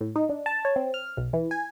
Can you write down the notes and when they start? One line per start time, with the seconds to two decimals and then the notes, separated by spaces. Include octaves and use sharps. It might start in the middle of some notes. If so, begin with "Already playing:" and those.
0.01 A2
0.16 D#4
0.29 D4
0.46 A5
0.65 C#5
0.76 C4
0.94 F6
1.17 B1
1.33 E3
1.51 G#5